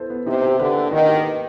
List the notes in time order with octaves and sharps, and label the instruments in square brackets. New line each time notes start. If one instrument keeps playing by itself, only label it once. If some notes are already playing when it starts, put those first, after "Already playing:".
Already playing: [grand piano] B3 E4 A4 C5
B3
[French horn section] C3 [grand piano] D#4
[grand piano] G4
[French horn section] D3 [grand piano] B4
[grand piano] A#3
[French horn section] D#3 [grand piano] D#4
[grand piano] G4
B4